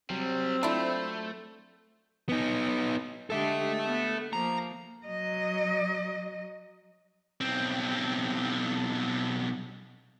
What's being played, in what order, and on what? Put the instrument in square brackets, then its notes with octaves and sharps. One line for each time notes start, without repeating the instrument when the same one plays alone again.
[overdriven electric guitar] C3 G3 [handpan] F#3 [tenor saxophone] C4
[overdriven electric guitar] A3 [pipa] D4 E4 [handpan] F4 A4 C5
[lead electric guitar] B3 D#4
[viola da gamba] D3 G#3 G4 [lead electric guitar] A4 E5
[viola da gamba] B3
[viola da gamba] F3 A#3 [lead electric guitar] A#5
[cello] F#3 D#5
[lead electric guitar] B1 C4